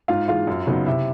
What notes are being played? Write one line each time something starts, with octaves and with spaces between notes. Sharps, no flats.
G#2 F4 F5
E3 G#3 F4 F5
F#2
C#3 F#3 B3 D#4
C3 E4 E5